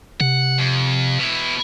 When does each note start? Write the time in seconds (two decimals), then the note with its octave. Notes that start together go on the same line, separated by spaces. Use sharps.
0.21 C3 F#5
0.58 F2
1.20 B2 E4